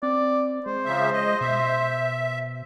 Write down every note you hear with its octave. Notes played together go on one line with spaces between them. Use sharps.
C4 D5
G#3 C5
C#3 F3 E5
D#5
B2 E5